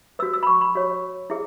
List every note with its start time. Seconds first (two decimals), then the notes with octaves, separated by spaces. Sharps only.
0.19 F#4 B4 E6
0.33 E6
0.43 B5
0.47 C#6
0.61 B5
0.75 F#4 C#5
1.30 E4 G#4